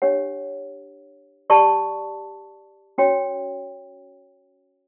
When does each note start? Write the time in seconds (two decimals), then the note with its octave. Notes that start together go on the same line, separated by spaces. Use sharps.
0.02 D4 G4 C#5 F#5
1.50 G4 D5 A5 C#6
2.98 C#4 F#4 C#5 G5